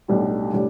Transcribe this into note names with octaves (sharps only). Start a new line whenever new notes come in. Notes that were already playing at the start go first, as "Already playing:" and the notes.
B1 A2 G3 D4 G4
A2 G3 D4